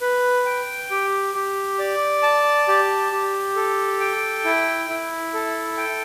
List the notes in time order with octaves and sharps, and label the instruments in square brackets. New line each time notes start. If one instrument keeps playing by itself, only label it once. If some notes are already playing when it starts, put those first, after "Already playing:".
[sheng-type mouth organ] B4
G5
G4
G4
D5
A5
G4
G4
A4
G5
E4
E4
A4
G5